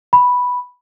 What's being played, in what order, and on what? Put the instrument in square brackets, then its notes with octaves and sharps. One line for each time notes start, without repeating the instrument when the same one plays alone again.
[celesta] B5